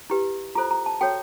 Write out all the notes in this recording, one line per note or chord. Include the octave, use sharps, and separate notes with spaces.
E4 G4 B4
F4 A4 C5 A#5
A#5
A5
F#4 A4 C#5 G5